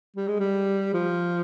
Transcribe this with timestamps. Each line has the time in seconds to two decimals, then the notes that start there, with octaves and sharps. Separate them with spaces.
0.16 G3
0.28 G#3
0.40 G3
0.94 F3